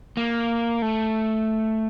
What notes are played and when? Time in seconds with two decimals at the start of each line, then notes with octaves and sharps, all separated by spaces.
0.17 A#3
0.82 A3